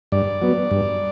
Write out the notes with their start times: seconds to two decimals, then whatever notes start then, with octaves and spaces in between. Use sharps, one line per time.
0.12 G2 D5
0.42 F#3 B3
0.71 G2